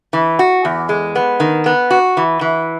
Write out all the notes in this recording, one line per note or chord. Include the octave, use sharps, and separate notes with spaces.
E3
F#4
E2
G#3
B3
D#3
B3
F#4
E3
E3